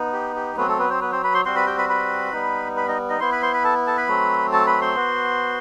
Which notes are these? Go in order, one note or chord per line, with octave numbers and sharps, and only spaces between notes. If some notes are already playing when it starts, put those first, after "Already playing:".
Already playing: B3 D#4
G4
G4
F#3 A3 B3 C4 B4
A3 A4
B3 B4
C4 C5
B3 B4
C4 C5
B4 B5
C5 C6
G3 C4 F#4 C5 C6
B4 B5
G4 G5
B4 B5
B4 B5
G3 B3 D#4
B4 B5
D#4 D#5
D#4 D#5
B3 E4 C5 C6
B4 B5
C5 C6
B4 B5
A4 A5
A4 A5
B4 B5
F#3 A3 C4
A4 A5
B4 B5
C5 C6
B3 F#4